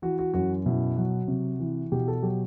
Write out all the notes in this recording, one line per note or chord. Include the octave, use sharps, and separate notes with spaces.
E3 F#4
F#4
F#2 F#4
B2 E4
F#3 F#4
C3
E3
B2 G4
A4
F#3 G4